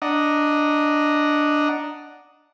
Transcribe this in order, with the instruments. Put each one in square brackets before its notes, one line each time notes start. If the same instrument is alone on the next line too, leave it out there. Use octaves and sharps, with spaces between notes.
[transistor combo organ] D4 D#5 F#5 A#5